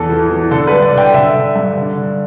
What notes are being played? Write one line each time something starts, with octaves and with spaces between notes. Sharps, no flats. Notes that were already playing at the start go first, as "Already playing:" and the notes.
Already playing: E2 A4
E3
E3
D3 A4
B4
G2
D5
D3
G5
D3 E5
D3
G2
D3
D3